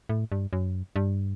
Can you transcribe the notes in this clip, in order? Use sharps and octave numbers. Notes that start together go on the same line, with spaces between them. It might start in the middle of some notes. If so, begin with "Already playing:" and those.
A2
G2
F#2
G2